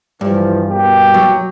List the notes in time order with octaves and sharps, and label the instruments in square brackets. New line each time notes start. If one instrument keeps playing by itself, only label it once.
[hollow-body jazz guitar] G2 [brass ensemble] E3 F3
[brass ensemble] B2 A#3 G4
[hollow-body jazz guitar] F#3